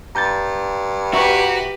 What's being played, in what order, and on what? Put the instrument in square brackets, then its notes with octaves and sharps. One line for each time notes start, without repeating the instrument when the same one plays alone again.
[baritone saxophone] G2 [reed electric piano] A#5 G6 A6
[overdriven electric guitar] F#4 [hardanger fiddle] G4 B4 [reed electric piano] E5 A#5 C#6